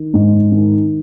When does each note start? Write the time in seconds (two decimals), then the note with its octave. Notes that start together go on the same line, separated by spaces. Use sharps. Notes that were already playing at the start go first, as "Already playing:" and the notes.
Already playing: D#3
0.14 G#2
0.52 D#3